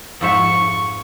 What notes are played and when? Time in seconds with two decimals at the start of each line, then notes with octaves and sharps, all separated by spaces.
0.21 F2 G#2 E5 C#6